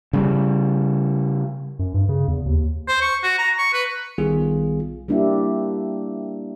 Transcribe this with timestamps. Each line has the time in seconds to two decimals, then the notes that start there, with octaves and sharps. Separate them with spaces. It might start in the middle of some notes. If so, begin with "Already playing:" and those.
0.13 C#3 G3
1.79 F#2
1.94 G2
2.09 C#3
2.28 E2
2.46 D#2
2.88 C5
3.01 C#6
3.23 F#4
3.38 A#5
3.58 C#6
3.73 B4
4.18 B1 D#3 G3 B3 F4 G#4
5.08 G3 A#3 D4 E4 G4 E5